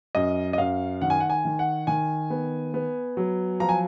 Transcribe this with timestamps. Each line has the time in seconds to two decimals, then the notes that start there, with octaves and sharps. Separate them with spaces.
0.15 F#2 D#5
0.53 D#5
0.58 F#2 F5
1.01 D#3 F#5
1.10 G#5
1.20 F#5
1.30 G#5
1.45 D#3
1.59 F#5
1.87 D#3 G#5
2.30 B3
2.74 B3
3.17 F#3
3.60 F3 A#5
3.69 G#5